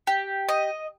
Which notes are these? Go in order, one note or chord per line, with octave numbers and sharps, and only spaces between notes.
G4
D#5